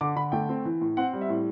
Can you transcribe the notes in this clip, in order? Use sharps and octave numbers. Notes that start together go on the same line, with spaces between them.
D3 D6
D3 B5
A3 G5
C4
E3
A2
C4 F#5
G3
E5
A2